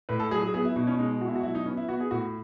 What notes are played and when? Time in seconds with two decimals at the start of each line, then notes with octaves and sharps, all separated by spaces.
0.09 A2 B4
0.20 A4
0.31 F#3 G#4
0.42 G#4
0.54 B3 G#4
0.65 E4
0.76 B2 D#4
0.87 C#4
0.99 G#3 D#4
1.21 B2 F#4
1.28 E4
1.36 F#4
1.43 F#3 E4
1.55 D#4
1.66 B3 C#4
1.77 E4
1.88 B3 F#4
2.00 G#4
2.11 A2 F#4